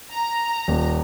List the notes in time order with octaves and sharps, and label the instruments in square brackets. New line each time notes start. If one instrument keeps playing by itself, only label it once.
[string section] A#5
[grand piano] D#1